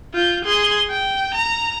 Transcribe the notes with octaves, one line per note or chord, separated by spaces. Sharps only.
F4 G6
G#4 C6
G5
A#5